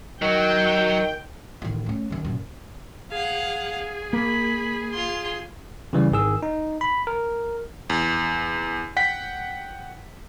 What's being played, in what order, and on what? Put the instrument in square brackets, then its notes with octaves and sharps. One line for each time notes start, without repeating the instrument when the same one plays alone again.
[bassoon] D#3 [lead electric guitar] F#3 [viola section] G5
[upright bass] A1 D#3
A3 C#4
F#2 D#3
F#2 A#2
[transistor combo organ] G#4 [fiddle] F5 F#5
[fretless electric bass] A#3 [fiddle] B5
[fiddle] F4 C6
[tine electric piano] C#3 E3 G3
G#1 D#3 G#4 E6
D#4
B5
A#4
[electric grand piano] E2
F#5 G5 B6